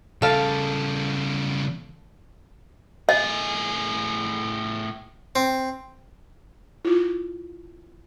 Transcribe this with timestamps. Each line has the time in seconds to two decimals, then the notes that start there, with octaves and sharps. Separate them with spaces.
0.22 C#3 G3 A4 F5
3.09 A2 G#4 D#5
5.36 C4
6.85 E4 F4